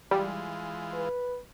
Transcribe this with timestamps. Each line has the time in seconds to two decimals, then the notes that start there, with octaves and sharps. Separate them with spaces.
0.11 E3 G3 G#3 F4
0.94 B4